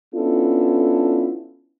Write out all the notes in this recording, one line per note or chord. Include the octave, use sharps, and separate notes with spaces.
B3 C#4 D4 E4 F4 A4